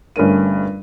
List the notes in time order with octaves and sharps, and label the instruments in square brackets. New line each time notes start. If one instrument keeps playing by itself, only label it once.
[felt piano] G1 G2 A3 C#4 A#4 D#7